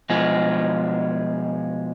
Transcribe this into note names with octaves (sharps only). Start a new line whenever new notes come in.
B2 F3 G#3 G#4